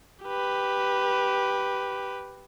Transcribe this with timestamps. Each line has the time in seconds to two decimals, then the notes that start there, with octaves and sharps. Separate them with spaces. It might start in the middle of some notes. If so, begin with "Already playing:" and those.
0.24 G4 B4